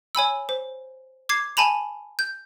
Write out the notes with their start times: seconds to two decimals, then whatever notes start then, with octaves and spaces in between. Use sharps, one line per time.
0.15 C#5 G#5 B5 E6
0.49 C5
1.29 D6 G#6 C7
1.57 G#5 A5 B5 F7
2.19 G6